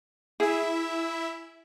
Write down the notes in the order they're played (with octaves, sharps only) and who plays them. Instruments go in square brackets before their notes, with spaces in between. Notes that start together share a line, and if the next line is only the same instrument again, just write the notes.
[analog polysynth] E4 E5 [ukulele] G#4